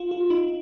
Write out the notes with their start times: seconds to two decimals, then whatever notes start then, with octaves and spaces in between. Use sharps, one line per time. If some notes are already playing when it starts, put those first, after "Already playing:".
Already playing: F4
0.11 F4
0.30 D#4